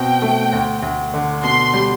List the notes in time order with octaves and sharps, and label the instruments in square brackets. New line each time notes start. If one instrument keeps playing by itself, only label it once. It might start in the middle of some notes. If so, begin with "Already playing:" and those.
Already playing: [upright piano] B2 C4 [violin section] G5
[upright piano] A3
D2
D2
D3
[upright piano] B2 [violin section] C6
[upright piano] G3